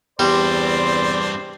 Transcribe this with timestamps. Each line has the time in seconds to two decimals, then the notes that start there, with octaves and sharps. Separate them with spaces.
0.19 E2 G2 G3 C4 C5 D5